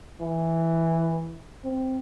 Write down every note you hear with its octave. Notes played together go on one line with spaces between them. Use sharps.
E3
C4